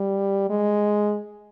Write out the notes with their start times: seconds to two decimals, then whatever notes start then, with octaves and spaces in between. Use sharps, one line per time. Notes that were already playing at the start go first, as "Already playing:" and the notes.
Already playing: G3
0.50 G#3